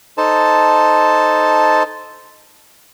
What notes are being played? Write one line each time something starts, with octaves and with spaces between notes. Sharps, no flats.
D#4 A4 C5 A5